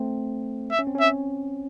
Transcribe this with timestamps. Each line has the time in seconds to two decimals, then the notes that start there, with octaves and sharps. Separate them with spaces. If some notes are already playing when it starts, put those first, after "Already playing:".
Already playing: A3 C4
0.71 E5
0.79 C#4
0.87 C4
0.95 C#4 E5